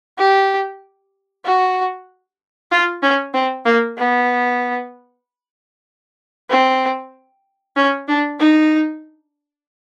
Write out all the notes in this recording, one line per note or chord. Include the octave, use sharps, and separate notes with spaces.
G4
F#4
F4
C#4
C4
A#3
B3
C4
C#4
D4
D#4